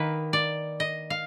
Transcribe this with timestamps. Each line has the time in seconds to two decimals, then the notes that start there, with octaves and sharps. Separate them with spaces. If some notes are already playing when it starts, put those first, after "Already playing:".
Already playing: D#3 A#3 B4
0.33 D5
0.80 D#5
1.10 F5